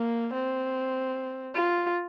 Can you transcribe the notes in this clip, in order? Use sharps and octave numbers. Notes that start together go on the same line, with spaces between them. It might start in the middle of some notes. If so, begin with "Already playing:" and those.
Already playing: A#3
C4
F4